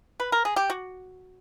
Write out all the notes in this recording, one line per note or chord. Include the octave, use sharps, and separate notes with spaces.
B4
A#4
G#4
G4
F#4